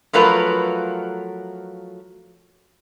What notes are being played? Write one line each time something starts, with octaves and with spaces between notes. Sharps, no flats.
F3 F#3 A3 F4 A#4 B4